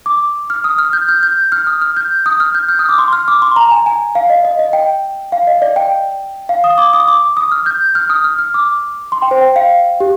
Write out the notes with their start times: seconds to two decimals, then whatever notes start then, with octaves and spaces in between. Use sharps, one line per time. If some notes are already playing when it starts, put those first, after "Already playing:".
0.06 D6
0.50 F6
0.64 D#6
0.78 F6
0.93 G6
1.08 F6
1.23 G6
1.52 F6
1.67 D#6
1.82 F6
1.97 G6
2.26 D#6
2.40 F6
2.55 G6
2.68 F6
2.79 D#6
2.89 D6
2.98 C6
3.13 F6
3.28 D6
3.42 C6
3.56 A#5
3.71 G#5
3.86 G#5
4.15 F5
4.30 D#5
4.45 D#5
4.59 D#5
4.73 G5
5.32 F5
5.47 D#5
5.62 D5
5.76 G5
6.49 F5
6.64 D#6
6.78 D6
6.93 D#6
7.08 D6
7.37 D#6
7.52 F6
7.66 G6
7.95 F6
8.10 D#6
8.24 F6
8.39 F6
8.54 D6
9.12 C6
9.22 G5
9.31 C5
9.41 G5
9.56 F5
10.00 G4